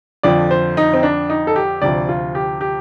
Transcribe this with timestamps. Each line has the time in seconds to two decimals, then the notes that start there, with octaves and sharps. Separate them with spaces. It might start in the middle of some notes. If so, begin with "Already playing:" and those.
0.23 F2 D3 F3 D5
0.51 C5
0.77 D#4
0.93 C4
1.03 D4
1.29 D#4
1.47 A4
1.56 G4
1.82 D2 C3 F3 D5
2.09 F4
2.35 G4
2.61 G4